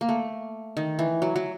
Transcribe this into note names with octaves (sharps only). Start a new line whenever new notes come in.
A#3
A3
D#3
E3
F#3
F#3